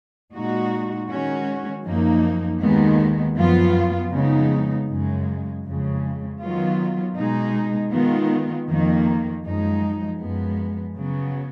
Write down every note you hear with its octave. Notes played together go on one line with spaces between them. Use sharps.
A#2 G#3 D#4 F#4
D#3 G#3 C#4 F#4
F#2 F3 A#3 D#4
D#2 D#3 G#3 B3
F#2 F3 B3 F4
F2 C#3 G#3 B3 D#4
F#2 C#3 G#3
F2 C#3 G#3
D#3 F#3 B3 F4
B2 G#3 D#4
D#3 G#3 B3 F4
F2 D#3 A#3
F#2 F3 G#3 D#4
F#2 F3 G#3 B3
C#3 F#3 B3